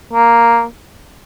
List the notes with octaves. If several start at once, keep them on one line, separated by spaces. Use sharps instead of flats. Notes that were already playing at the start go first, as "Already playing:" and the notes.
A#3